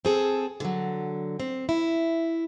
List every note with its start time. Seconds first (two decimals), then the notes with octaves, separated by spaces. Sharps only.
0.05 C4 G#4 A4
0.60 D3 F#3
1.40 C4
1.69 E4